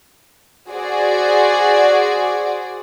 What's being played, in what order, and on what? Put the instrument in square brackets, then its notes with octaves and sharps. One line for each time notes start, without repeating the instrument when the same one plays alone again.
[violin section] F#4 G#4 C5 D5